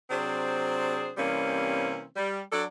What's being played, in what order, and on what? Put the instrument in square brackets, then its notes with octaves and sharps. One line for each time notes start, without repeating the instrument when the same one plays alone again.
[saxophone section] C3 F#3 C4 D4 G#4 C5
C3 E3 G3 A#3 C4 C#4
G3
F#3 D4 A4 D5